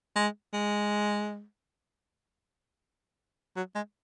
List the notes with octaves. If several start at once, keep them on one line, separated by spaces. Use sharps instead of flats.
G#3
G#3
F#3
G#3